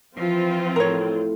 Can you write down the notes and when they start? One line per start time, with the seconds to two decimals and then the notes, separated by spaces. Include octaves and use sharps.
0.17 E3 F3 C4 F4
0.76 A2 A#4 C#5